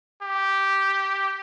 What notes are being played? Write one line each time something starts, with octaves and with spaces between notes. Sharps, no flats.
G4